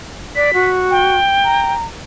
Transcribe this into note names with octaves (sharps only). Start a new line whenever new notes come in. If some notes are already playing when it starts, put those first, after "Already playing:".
D5 B6
F#4
G5
A#5